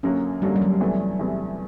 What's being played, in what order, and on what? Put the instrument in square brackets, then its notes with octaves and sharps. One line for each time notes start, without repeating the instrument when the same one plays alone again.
[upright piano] F#2 D3 F#3 A#3 [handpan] C#4
[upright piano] F#2 D3 F#3 A#3 [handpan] G3
[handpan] G3
F#3
[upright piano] E2 C3 E3 A3
E2 C3 E3 A3